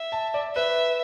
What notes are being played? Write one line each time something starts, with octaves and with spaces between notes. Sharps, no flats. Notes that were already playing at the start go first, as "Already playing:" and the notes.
Already playing: E5
A5
D5
B4 E5